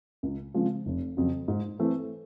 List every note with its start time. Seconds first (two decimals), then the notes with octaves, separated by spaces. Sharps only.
0.23 C#2
0.54 C#3 F3 G#3 C4
0.86 F1
1.17 F2 C#3 F#3
1.48 G#2
1.79 E3 A3 C4